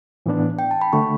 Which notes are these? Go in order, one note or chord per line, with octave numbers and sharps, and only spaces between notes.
A2 E3 B3 D4
G5
A5
B5
D3 A3 C#6